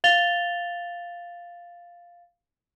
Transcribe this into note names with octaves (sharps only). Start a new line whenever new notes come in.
F5 A6 F7 G7